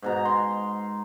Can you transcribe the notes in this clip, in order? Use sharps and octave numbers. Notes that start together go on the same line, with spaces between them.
G#2 B2 A#5
C6